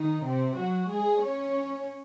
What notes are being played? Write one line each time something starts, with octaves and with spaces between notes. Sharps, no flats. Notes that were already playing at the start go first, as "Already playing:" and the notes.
Already playing: D#3 D#4
C3 C4
F#3 F#4
G#3 G#4
C#4 C#5